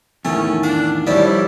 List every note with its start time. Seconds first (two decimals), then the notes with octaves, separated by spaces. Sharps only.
0.25 E2 A2 D#3 A3 C#4
0.63 D4 F5
1.07 F#2 F3 G3 E4 D5